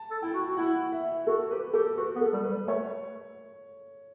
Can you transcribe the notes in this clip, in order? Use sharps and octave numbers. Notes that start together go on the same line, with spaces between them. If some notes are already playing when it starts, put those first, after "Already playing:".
Already playing: A5
A4
E4 G5
F#4
F#4
E4 F#5
E5
F#4 A4
G4 B4
G4 A4
F#4 B4
B3
A4
G3
B4
G3
A3 C#5